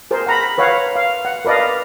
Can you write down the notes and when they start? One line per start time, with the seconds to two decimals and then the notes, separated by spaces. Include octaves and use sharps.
0.11 G#4 A#4 C5
0.26 F#5 A#5 B5
0.58 B4 C#5 F5 F#5
0.96 F5
1.25 F#5
1.45 A#4 B4 D5 D#5 F5